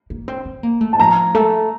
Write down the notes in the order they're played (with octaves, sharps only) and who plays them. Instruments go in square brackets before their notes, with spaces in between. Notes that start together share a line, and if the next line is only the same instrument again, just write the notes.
[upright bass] A#3
C4
C4
A#3
A3
[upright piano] A5
[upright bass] F3 [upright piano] A#5
[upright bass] A3